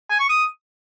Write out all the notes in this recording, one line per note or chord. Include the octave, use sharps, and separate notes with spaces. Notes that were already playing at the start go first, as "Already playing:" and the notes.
G#5
C#6
D#6